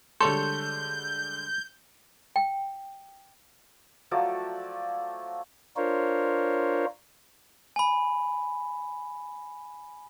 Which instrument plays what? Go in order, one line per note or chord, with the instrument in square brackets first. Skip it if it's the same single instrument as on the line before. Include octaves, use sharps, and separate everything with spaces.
[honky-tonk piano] D3 G3 G#3 [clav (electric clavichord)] A4 C#5 [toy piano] C6 [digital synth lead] G6
[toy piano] G5
[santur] F3 F#3 A3 D5
[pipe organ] D4 F4 A#4 C5 C#5
[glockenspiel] G#5 B5